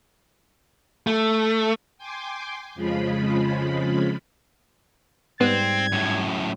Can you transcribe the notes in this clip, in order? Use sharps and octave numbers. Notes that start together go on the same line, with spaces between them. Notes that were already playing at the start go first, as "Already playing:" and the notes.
A3
G5 G#5 C6 D6
F2 C#3 F3 G#3 F4 B5
G#2 G3 B3 C4 G#6
F#2 A2